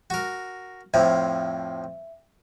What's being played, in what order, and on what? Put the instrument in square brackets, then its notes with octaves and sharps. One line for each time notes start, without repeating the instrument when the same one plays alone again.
[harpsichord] F#4 A#4
[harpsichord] F2 A2 F3 [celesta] E5